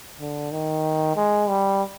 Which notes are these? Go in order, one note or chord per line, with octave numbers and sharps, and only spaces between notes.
D3
D#3
G#3
G3